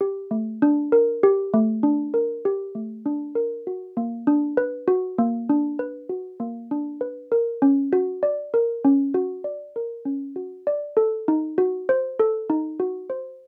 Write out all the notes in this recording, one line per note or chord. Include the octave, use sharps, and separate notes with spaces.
G4
A3
D4
A#4
G4
A3
D4
A#4
G4
A3
D4
A#4
F#4
A#3
D4
B4
F#4
A#3
D4
B4
F#4
A#3
D4
B4
A#4
C#4
F#4
D5
A#4
C#4
F#4
D5
A#4
C#4
F#4
D5
A4
D#4
F#4
C5
A4
D#4
F#4
C5